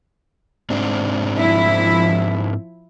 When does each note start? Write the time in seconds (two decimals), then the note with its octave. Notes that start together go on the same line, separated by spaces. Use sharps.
0.70 G#2 C4 D4
1.37 F3 E4